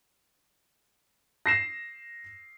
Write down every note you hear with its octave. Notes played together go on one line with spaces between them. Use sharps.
A#6 C7 E7